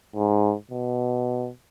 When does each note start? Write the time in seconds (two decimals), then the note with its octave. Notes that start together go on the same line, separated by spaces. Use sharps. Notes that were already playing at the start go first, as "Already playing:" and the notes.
0.15 G#2
0.71 B2